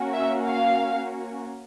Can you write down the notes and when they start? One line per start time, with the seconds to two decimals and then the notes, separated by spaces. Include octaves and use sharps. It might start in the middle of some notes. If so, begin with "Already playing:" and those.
Already playing: A#3 C#4 F#4
0.14 E5
0.47 F5